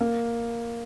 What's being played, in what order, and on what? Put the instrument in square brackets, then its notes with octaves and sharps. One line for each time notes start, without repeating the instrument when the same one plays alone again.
[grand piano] A#3